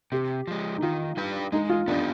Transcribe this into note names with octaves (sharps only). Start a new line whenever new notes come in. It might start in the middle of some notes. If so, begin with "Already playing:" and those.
C3 G4
F3 G#3
D#4
D#3 F4
G3 D4 G4 B4
G#3 D#4
F4
B3 D4 D#4 G4